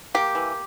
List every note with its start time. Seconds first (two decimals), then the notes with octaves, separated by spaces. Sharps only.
0.14 A#3 G4
0.35 E3